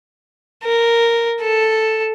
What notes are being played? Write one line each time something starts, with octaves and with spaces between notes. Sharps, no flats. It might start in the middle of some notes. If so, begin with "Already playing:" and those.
A#4
A4